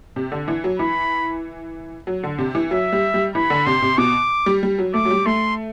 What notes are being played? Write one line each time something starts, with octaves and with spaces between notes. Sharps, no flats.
C3
D3
E3
F#3
E3 B5
F#3
D3
C3
E3
F#3 E5
G3
G3
E3 B5
D3
C3 C6
C3
B2 D6
G3
G3
F#3
A3 D6
F#3
G3
A3 C6